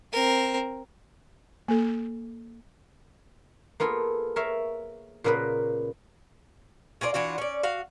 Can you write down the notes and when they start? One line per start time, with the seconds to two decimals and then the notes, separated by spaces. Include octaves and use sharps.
0.13 C4 A#4
1.68 A#3 A4
3.80 A#3 B3 F4 G#4 A4
4.36 A#4 C#5 E5 F5
5.24 A#2 C#3 A#3 B3 B4
7.01 C#4 F4 A#4 D5
7.14 E3 D4 F4 F#4
7.38 C#4 D5
7.63 F#4 F5